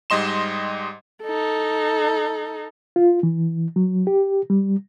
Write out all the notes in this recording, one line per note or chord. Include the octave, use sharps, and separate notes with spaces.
G#2 G3 D#5 C6 E7
D#4 A4
F4
E3
F#3
G4
G3